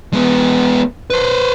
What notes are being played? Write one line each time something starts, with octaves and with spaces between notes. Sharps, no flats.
G#3 B3
B4 C5